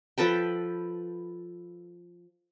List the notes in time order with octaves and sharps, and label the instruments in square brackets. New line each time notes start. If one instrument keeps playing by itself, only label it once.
[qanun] F3 A4 B4 G5